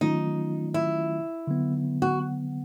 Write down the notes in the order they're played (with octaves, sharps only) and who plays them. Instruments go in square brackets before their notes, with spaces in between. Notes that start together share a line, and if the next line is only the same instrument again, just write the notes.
[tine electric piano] D#3 F#3 A3 C#4 F4 [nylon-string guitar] D#4
[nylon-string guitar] E4
[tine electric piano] D3 F#3 B3
[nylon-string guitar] F#4